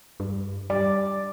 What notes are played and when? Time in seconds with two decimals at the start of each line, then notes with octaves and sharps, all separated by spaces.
0.20 G2
0.70 G3 D5